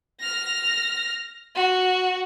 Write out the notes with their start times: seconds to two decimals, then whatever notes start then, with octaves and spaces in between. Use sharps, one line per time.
0.20 F6 A#6
1.55 F#4